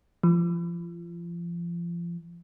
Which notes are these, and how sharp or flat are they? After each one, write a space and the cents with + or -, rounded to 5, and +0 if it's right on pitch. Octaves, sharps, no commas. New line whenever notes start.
F3 -30